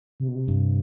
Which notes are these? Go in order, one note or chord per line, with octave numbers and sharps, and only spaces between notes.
C3
B2
C3
G2